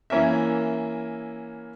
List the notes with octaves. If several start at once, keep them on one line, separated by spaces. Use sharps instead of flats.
E3 A#3 C#4 A#4 E5